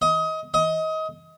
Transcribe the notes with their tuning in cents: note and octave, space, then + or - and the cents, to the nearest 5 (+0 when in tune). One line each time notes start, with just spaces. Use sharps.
D#5 +25
D#5 +25